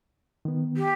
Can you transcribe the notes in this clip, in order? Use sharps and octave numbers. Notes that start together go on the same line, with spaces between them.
D#3 B3
G4